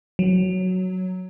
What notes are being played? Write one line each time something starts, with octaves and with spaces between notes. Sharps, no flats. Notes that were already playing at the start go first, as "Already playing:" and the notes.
F#3